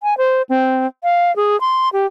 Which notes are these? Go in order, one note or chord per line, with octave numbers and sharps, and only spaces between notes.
G#5
C5
C4
F5
G#4
C6
G4